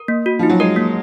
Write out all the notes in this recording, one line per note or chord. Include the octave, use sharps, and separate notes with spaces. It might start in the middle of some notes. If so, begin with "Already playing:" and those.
Already playing: A#4
A#3
F#4
F3 D#4
F#3
G#3 A#4
A#3